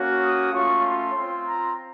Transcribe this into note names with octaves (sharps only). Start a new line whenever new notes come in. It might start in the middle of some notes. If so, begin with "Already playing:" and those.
Already playing: A#3 C#4 F#4
D#6
A3 C#4 F4 C#6
C6
C4 F4
A#5